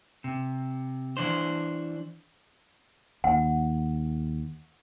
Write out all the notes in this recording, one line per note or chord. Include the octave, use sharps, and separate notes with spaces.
C3
E3 D4 C5
D#2 F#5